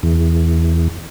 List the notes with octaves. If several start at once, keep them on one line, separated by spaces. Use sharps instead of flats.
E2